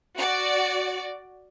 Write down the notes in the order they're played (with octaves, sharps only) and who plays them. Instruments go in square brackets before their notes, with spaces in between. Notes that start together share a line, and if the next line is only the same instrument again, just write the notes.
[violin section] F#4 D5